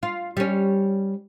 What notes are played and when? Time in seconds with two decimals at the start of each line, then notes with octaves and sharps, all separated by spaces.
0.03 F4
0.37 G3 C#4